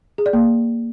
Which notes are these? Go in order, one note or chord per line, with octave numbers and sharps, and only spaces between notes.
G#4
D5
A#3